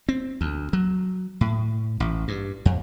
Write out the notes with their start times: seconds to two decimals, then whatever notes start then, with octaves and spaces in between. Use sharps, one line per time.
0.09 C4
0.41 D2
0.73 F#3
1.41 A2
2.00 A1
2.28 G2
2.65 F2